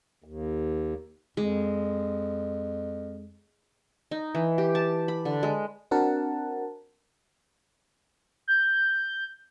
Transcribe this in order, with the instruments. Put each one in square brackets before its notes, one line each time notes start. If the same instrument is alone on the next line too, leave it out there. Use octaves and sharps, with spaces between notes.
[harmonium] D#2
[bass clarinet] F2 [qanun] G#3
[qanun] D#4
E3
G4
A5
B5
D3
G#3
[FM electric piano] C4 D4 F#4 A#4 F#5 A5
[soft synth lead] G6